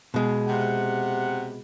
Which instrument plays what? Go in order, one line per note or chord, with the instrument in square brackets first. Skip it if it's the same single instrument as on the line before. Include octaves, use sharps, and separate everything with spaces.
[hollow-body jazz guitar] B2 G#3
[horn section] C3 F#5